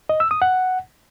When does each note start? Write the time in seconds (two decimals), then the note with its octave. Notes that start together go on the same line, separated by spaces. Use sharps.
0.09 D#5
0.20 E6
0.31 D#6
0.42 F#5